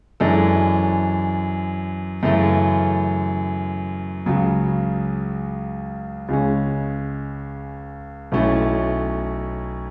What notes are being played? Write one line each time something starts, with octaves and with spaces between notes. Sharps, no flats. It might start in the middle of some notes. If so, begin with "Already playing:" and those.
F#2 E3 G#3 D4 A4
F#2 C#3 E3 A3
C#2 C#3 F#3
C#2 C#3 G#3 C#4
B1 B2 A3 C#4 E4